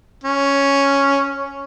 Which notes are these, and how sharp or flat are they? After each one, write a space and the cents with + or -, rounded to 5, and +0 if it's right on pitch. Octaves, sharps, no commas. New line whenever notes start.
C#4 +0